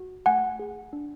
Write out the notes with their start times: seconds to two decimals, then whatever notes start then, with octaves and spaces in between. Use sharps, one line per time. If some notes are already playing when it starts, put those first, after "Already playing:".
Already playing: F#4
0.26 A3 F#5 G#5
0.59 G#4
0.93 D4